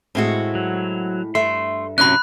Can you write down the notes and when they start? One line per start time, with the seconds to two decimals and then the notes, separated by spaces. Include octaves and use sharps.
0.15 A2 G#3 C4 E4 F#4
0.55 F#3
1.35 G2 A3 E5 C6
1.98 A2 C3 F#3 C#4 B5 F#6